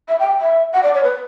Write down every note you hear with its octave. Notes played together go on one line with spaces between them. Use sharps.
E5
G5
E5
F#5
D5
C#5
B4